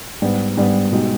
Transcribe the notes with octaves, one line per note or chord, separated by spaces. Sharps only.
G#2 G3 B3
G#2 G3 B3
B2 G#3 D#4 G4